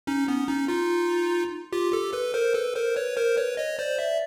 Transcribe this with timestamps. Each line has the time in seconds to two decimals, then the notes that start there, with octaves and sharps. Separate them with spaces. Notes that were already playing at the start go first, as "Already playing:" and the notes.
0.07 C#4 D#4
0.28 B3 C#4
0.48 C#4 D#4
0.68 D#4 F4
1.72 F4 G4
1.92 G4 A4
2.13 A4 B4
2.34 A#4 C5
2.54 A4 B4
2.75 A#4 C5
2.96 B4 C#5
3.17 A#4 C5
3.37 B4 C#5
3.57 C#5 D#5
3.79 C5 D5
3.99 D5 E5